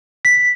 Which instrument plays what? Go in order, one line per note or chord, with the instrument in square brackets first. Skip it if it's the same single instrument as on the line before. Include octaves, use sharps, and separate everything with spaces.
[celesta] B6